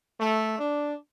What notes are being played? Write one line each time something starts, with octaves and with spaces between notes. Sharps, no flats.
A3
D4